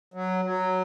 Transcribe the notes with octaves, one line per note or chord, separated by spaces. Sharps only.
F#3
F#3